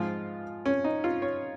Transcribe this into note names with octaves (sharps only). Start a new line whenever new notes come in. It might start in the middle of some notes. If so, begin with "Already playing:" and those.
Already playing: G#2 F3 G#3 F4
C#4
D#4
F4
C#5